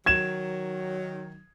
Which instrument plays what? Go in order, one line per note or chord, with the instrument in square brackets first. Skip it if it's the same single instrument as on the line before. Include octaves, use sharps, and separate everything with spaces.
[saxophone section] D#3 F#3 [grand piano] G#6 E7